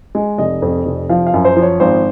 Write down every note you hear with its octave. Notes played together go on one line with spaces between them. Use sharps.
G#3
F1 D#5
F2
F1
F3 F5
F5
F#2
C5
F3
C#5
G#1 C5